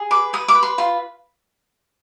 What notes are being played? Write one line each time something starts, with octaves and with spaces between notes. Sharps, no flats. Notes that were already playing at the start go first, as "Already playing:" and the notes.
Already playing: G#4
B4 D6
B4 D#6
D6
B4
C6
F4 C6